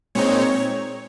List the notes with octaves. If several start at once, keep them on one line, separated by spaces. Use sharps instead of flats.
A#2 G#3 C4 D#4 C#5